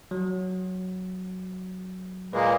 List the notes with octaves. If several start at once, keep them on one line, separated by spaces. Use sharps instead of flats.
F#3
A#2 G#3 A#3 B4